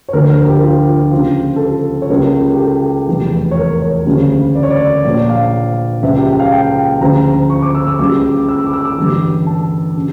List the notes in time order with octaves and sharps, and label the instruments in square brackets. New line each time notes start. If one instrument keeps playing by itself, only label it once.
[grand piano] C#5
D2 D3 F3 A#4
A#4
G4
F4
F4
C#2 C#3 F3 F4
A4
G4
C#5
C#2 C#3 G3 A#4
G4
A4
F1 E2 E3 G3
C#5
A#4
C#5
D2 C#3 G3
D5
C#5
D5
A#1 A#2 F3 D5
F5
C#2 C#3 F3 E5
G4
G4
F5
G5
D2 C#3 F3 A#5
C#6
D6
E6
E6
C#2 C#3 G3 D6
E6
D6
E6
D6
A1 G2 D3 G3
A5
C#3